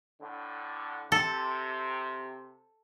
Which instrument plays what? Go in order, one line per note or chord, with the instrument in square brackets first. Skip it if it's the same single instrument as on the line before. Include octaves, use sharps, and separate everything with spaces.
[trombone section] A2 D3
[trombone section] C3 [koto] A4